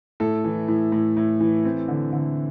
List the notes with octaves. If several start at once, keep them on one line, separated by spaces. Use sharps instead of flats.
A2 A4
E3
A2
A2
A2
E3
C4
D3
D3